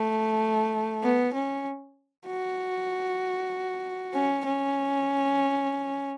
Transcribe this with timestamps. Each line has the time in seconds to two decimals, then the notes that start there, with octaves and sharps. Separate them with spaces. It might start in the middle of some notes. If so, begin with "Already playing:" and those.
Already playing: A3
1.03 B3
1.34 C#4
2.27 F#4
4.14 C#4
4.45 C#4